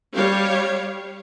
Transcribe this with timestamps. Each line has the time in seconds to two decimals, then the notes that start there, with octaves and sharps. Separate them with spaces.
0.13 G3 G4 C#5 F5